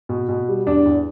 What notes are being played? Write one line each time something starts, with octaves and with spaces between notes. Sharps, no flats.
B2
B2
G3
E2 D4
E2